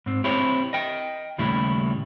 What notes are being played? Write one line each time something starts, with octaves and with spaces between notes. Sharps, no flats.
G#2 C4
C4 E4 G4 C5 C#5
D#5 G5
D#2 A2 C#3 G3 E4